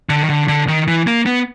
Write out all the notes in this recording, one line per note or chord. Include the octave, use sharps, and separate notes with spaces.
D3
D#3
D3
D3
D#3
E3
A#3
B3